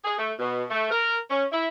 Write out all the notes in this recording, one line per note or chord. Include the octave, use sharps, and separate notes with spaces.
G#4
A3
B2
A3
A#4
C#4
E4